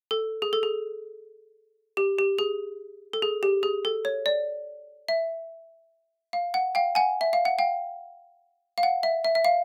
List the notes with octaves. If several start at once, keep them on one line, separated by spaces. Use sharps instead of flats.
A4
G#4
A4
G#4
G4
G4
G#4
A4
G#4
G4
G#4
A4
C#5
D5
E5
F5
F#5
F5 G5
F#5 G#5
E5
F5
F#5
F5 G5
F5
F#5
E5
E5
E5
F5